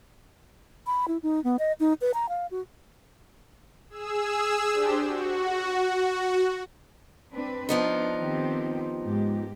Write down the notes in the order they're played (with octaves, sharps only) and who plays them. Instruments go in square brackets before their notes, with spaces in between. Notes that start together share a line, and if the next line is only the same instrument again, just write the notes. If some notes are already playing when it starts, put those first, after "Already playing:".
[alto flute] B5
E4
D#4
B3
D#5
D#4
B4
A#5
F5
F#4
[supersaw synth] G#4 E6
D4 G4 C5
F#4
[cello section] C4 D4 B4
[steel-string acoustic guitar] F3 B3 D#4 [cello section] D4
[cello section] D#3 C4 G4
G#2 G4